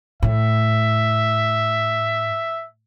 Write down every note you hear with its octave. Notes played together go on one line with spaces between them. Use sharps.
A2 E5